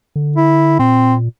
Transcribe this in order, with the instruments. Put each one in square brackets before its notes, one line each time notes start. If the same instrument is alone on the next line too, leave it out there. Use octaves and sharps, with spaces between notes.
[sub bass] D3
[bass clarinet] E4
[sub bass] A#2 [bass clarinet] C4